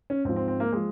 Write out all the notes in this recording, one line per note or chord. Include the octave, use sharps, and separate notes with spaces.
C#4
G#2 F3 C4
C4
C4
A#3
F3 G#3